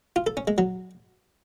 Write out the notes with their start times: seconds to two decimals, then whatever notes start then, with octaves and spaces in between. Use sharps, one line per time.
0.16 F4
0.27 A4
0.37 C#4
0.47 G#3
0.58 F#3